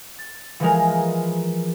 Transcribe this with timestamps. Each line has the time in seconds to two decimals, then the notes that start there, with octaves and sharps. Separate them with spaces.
0.18 A6
0.60 E3 F3 G#3 A#4